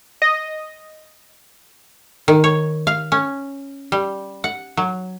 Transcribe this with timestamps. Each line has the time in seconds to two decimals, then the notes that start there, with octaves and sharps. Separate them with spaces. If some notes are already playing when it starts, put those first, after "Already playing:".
0.22 D#5
2.28 D#3
2.44 C#5
2.87 F5
3.12 C#4
3.92 G3
4.44 F#5
4.77 F#3